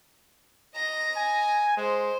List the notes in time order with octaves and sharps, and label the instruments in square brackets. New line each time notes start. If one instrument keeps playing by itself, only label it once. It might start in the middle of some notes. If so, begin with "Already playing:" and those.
[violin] D#5 A#5
[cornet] G#5
[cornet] G#3 [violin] C5